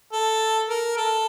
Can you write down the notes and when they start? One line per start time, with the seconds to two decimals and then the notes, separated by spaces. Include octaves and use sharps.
0.13 A4
0.69 A#4
0.97 A4